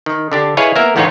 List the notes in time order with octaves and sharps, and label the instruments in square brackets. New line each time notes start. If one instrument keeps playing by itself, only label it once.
[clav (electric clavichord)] D#3
D3 D4 G4
E4 G#4 B4 C#5 D#5 F5
A#3 B3 A#4 E5
E2 A2 B3 D#4 F4 C#5